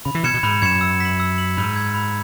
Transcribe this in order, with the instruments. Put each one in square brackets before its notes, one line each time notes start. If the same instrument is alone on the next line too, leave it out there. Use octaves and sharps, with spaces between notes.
[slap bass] C#3 [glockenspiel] B5
[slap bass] E3
[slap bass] B2 [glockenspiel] G#6 C#7 E7
[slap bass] B2
[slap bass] G#2 [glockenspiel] B5
[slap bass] F#2 [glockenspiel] G#6 C#7 E7
[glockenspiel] E6
B6 F#7
E6
B6 F#7
[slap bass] G#2 [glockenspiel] B5
[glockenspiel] E6 G#6
B5